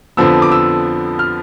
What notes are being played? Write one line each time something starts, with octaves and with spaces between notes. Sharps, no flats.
F2 D3 F3 B3 E6
D6
E6
F6